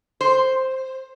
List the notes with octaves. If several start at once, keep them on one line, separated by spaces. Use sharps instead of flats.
C5